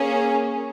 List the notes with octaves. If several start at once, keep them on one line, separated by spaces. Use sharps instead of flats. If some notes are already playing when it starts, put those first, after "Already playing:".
Already playing: A#3 C#4 G#4